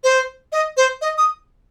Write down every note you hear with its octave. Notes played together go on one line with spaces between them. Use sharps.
C5
D#5
C5
D#5
D#6